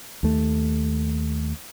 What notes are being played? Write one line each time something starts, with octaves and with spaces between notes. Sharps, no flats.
D#2 A3